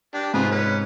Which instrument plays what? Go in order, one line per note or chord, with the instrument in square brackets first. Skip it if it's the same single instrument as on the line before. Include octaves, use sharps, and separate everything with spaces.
[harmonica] D4 G4
[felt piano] G#2 C3 [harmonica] F4 G#4 B4
[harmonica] C#4 B4